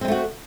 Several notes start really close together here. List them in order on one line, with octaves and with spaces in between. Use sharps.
C4 G#3 A3 F#4